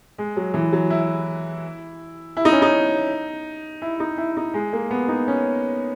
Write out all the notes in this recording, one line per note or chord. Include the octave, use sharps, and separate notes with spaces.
G#3
F#3
E3
F#3
E4
E4
D#4
C#4
D#4
E4
D#4
E4
D#4
G#3
A#3
B3
D#4
C#4